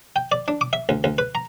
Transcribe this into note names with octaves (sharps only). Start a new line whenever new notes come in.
G5
D5
D4
D6
E5
D2
D2
B4
A#5